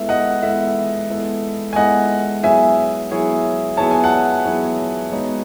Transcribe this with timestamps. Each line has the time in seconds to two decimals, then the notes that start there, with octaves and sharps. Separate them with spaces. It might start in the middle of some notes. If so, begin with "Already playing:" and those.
Already playing: G#3 B3 E4 A4 E5
0.09 D#5 F#5
0.43 G#3 B3 E4 A4 E5
1.10 G#3 B3 E4 A4
1.73 G#5
1.76 G#3 B3 E4 A4 D#5 F#5
2.43 F#3 B3 E4 G#4 C#5 E5 G#5
3.11 F#3 B3 E4 G#4 C#5
3.77 F#3 B3 E4 G#4 C#5 A5
3.91 G#5
4.04 F#5 A5
4.44 F#3 B3 E4 G#4 C#5
5.12 G#3 B3 D#4 F#4 C#5